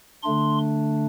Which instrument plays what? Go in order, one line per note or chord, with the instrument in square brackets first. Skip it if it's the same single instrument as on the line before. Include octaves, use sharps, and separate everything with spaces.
[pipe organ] D3 A3 D4 C6